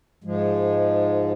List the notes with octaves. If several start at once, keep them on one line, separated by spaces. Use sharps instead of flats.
G#2 F3 G#3